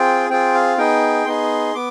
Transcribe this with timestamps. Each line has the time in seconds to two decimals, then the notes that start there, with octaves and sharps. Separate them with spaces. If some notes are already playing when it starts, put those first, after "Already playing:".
Already playing: C4 F4 G#4 G5
0.29 C4 F4 G#4 G5
0.55 F5
0.78 B3 D#4 G#4 G5
1.26 B3 D#4 G#4 C6
1.75 B3 D6